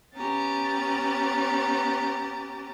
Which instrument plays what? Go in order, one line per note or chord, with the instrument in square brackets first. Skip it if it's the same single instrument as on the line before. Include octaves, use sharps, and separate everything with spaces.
[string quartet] B3 C#4 G4 A#5 A6